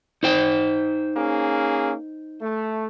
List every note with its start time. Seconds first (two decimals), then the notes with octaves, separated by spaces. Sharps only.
0.23 D#4 C5 G5
1.15 A#3 C#4 G#4
2.42 A3